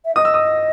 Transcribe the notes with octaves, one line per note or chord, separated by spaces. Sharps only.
E5
D#5 D#6
E6
D#6